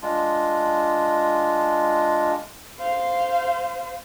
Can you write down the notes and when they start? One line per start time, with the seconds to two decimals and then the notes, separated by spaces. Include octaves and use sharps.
0.02 G#3 D4 F4
2.80 C5 F5